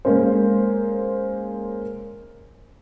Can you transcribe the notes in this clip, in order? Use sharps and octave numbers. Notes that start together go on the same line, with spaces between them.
G#3 A#3 C#4 C5